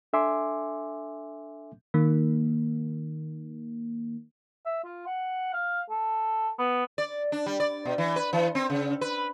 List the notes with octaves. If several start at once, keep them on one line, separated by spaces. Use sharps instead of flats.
D4 A4 E5 G#5 C6 D6
D#3 A#3
E5
F4
F#5
F5
A4
B3
D5
D4
G3
D5
B2
E3
B4
E3
C4
C#3
B4